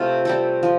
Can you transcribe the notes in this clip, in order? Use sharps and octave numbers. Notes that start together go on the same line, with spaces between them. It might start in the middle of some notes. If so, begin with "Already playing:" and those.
Already playing: C3 A3 F4
G3 C4 A4
F3